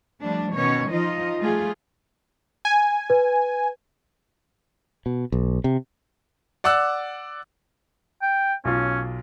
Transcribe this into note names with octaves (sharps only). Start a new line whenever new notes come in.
F3 G3 A3 D4
B2 D#3 C#4 C#5
F3 D#4 F4 D#5
G3 A3 F4 G#4
G#5
B4
B2
B1
C3
D5 F#5 D6 E6 F#6
G5
B1 C#4 F4